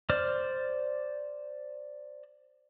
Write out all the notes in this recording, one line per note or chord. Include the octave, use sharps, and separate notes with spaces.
C5 D5 F6